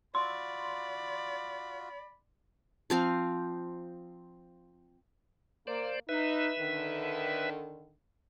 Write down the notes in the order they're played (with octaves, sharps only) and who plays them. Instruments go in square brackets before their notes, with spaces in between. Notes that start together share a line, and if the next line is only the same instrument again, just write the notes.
[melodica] F4 F#4 [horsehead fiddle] D5 [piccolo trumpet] B5 [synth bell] C6
[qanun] F3 C4 F5
[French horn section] A#3 [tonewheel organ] C5 D5
[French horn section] D#4 [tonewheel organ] B4 E5
[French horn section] D3 D#3